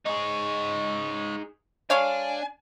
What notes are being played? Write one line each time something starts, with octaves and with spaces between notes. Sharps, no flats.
G#3 D#4 G#4 C#5
G#3 D4 C#5 F5 G#5